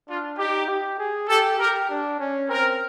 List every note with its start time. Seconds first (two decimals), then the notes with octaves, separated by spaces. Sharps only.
0.09 D4 F4
0.38 D#4 G4
0.68 G4
0.99 G#4
1.28 G4 A4
1.59 G4 A#4
1.90 D4
2.19 C#4
2.49 C4 A#4